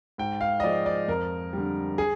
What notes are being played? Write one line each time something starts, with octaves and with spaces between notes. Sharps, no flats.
G#2 G5
F5
D#5
F3 G#3 D5
D5
F2 A#4
D3 G3
G#4